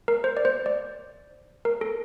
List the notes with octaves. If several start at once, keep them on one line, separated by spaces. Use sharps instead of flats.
A#4
C5
D5
C5
D5
A#4
A4